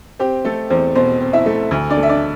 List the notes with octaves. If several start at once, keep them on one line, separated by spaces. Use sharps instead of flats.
C4 G4
A3 A4
E2 C4 C5
B2 C4 C5
C4
E4 E5
A3
D2
D4 D5
A3
E5
D4 D5